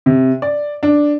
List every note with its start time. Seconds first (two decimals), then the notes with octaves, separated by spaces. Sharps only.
0.06 C3
0.42 D5
0.83 D4